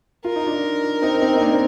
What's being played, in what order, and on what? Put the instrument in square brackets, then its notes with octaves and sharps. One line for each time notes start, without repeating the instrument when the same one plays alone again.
[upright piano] F4 [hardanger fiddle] A#4
[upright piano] D#4
D4 F4
C4 D#4
C4 D#4
D#4
A#3 D4
C4